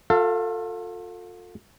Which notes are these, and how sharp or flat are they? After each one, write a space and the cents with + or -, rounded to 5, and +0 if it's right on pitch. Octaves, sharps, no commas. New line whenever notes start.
F4 +40 A4 +20 F5 -25